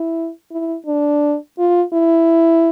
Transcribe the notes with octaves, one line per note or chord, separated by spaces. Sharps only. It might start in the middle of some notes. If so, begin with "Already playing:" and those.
Already playing: E4
E4
D4
F4
E4